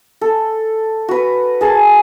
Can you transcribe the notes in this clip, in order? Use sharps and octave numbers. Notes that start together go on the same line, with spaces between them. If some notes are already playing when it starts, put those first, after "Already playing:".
A4
F#4 B4
G#4 A#4 A5